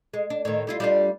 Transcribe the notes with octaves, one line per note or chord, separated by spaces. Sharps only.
G#3
D4
A2 D#3
G3 E4 F4
G3 D4 F4